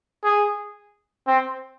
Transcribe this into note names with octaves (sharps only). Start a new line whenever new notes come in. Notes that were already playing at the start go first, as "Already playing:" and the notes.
G#4
C4